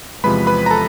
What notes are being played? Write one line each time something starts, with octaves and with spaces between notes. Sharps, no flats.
E2 C3 F3 G#3 B4 B5
B4 B5
A#5
A4 A5